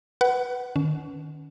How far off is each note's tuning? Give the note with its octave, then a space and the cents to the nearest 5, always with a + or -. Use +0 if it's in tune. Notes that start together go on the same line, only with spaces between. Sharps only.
B4 +0 F#5 +20
D#3 -30 C#4 +30